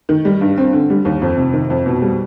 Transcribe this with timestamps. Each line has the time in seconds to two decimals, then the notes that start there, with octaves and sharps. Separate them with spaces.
0.09 D#3
0.25 G3
0.41 G2
0.58 C4
0.73 D3
0.90 G3
1.05 D#2
1.22 F2
1.37 C3
1.53 D#3
1.70 F2
1.86 B2
2.02 G3